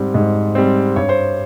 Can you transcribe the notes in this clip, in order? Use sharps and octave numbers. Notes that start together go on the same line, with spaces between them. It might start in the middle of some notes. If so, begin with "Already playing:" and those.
Already playing: G#2 G3 C4
G#2
G3 C4
G2 C#5
C5